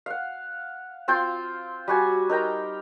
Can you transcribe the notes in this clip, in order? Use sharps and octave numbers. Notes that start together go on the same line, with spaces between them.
F5 F#5
C4 F4 G5 C6
G3 F#4 G#5
D#4 A#4 G5 A#5